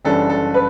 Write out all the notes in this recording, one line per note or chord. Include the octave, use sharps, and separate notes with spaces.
F#1 F#2 E3 G3 D4 A4
A4
B4